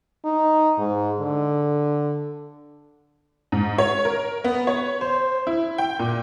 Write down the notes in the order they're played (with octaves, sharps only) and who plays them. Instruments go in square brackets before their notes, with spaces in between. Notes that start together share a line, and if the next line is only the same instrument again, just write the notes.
[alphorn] D#4
G#2
D3
[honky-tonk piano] G#2
C#5
A#4
B3
C#5
C5
E4
G5
A#2